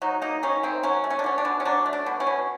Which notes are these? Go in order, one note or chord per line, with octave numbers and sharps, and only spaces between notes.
F#3 D#4
A#3 D#4
D#3 C#4
D#3 C4
F#3 C#4
A3
C#4
D4
B2 C#4
D4
B2
C#4
F#3 D4
A3
D4
B2
C#4
B2